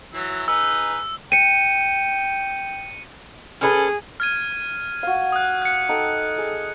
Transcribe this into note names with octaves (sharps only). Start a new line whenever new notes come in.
E3 F#3 E6
D#4 G#4 B4 E6
G5 C#7 D#7
C#4 G#4 A4 B4
F6 G#6 D#7
F#4 F5
D#6 F#6
F#6 C#7
D#4 A4 G5
G#4